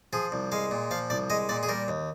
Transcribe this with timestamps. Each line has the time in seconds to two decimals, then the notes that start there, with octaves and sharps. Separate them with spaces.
0.13 F3 G#4
0.32 C2
0.52 G#3 F5
0.71 A#2
0.91 F3 F5
1.10 C2 D5
1.30 G#3 D#5
1.49 A#2 D5
1.63 G#4
1.68 G3 A#4
1.88 D#2